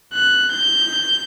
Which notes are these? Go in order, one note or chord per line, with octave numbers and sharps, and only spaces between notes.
F#6
G6